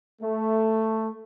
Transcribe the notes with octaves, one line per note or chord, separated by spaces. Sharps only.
A3